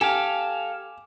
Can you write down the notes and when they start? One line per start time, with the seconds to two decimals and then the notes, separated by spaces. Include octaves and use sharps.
0.01 G4 A4 F5 G#5